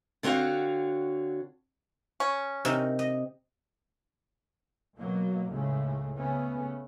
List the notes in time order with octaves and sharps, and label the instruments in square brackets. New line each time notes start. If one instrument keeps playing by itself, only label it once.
[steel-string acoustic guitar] D3 C4 F#4 C#5 F5
[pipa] C#4
[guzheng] C3 D#4 A#4
D#5
[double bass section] B2 F#3 A#3
C#2 A2 C#3 A3
C#3 A3 B3 C#4